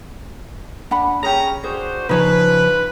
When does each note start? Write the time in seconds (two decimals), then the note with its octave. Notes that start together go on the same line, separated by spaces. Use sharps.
0.91 D4 F#5 B5
1.23 C#4 G4 G#4 A#5
1.64 D4 F#4 G#4 C5
2.09 C#3 F3 D#4 B4 C#5